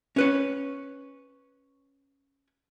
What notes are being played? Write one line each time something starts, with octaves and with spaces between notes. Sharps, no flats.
C#4 B4 C#5